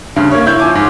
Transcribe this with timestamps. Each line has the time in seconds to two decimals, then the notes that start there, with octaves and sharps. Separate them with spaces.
0.16 D2 G2 C#3
0.32 A#3 C#5
0.46 E4 C#5 E5 G6
0.59 F3 G#5 D6
0.75 G#2